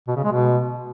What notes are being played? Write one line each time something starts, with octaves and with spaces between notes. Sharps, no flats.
B2
C#3
G#3
B2